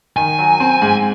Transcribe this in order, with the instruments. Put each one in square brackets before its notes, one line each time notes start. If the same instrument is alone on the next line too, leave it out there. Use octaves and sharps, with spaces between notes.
[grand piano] D#3 [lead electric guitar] G#5
[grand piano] F#3
C4
G#2